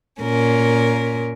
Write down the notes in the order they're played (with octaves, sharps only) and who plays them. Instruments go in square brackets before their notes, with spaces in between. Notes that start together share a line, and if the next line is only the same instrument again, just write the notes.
[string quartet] A#2 C#4 A#4